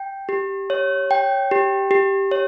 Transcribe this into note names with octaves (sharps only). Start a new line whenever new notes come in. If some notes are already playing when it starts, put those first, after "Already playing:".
Already playing: G5
G4
C#5
G5
G4
G4
C#5